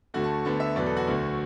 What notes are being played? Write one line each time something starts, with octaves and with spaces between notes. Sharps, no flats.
D2 D3 A3 F#4
A5
D2 D3 B3 A5
E5
E2 B2 F#3 B3 D5
A4
F#4
D2 D3 A3